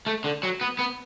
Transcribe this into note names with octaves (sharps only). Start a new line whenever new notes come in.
A3
D3
F#3
B3
B3